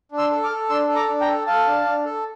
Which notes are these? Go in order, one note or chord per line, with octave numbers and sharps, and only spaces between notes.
D4
C6 E6
A4
D6 F6
A4
D4 C6 E6
A4
A#5 D6
D4
G5 A#5
A4
A4 F5 A5
D4
D4
A4